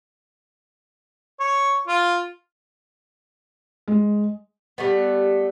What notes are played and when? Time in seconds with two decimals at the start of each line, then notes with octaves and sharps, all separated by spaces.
1.40 C#5
1.88 F4
3.88 G#3
4.78 G3 A3 B3